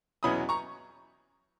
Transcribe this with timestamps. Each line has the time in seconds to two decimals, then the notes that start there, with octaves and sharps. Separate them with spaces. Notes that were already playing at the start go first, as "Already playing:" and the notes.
0.23 E2 B2 F#3 C#4 E4 B5 D#6
0.49 A#5 C#6